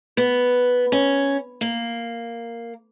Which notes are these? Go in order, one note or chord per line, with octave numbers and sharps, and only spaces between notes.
B3
C#4
A#3